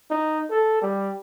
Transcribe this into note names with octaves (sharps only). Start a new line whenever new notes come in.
D#4
A4
G3